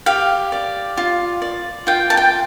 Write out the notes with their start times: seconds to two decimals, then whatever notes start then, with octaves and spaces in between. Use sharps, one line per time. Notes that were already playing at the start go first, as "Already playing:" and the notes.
0.06 G4 F5
0.52 D5
0.97 F4
1.42 D5
1.87 F4 G5
2.10 A5
2.17 G5